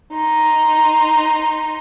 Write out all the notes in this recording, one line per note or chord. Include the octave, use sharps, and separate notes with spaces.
D#4 C6